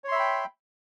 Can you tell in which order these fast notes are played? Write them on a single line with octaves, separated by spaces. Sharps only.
C#5 C6 E5 B5 G5